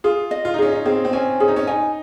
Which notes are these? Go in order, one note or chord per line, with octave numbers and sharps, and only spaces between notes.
F4 G#4
D#5
F4
D#4
C#4 G#4
D#4
C4 G#4
C4
C#4 G#5
C#4 G#4
D#4
C#4
D#4 G#5